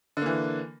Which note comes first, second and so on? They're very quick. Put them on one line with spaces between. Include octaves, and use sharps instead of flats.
D3 A#3 E3